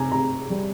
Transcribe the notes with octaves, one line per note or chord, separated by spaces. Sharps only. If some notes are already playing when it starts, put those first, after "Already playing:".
Already playing: C3 G#5 A#5
C3 A#5
G3